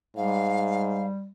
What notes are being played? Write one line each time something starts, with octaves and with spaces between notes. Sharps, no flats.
G#2 G3 F5